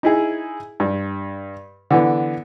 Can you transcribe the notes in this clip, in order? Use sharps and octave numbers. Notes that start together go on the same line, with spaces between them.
D#4 E4 G#4
G2
D3 E3 B3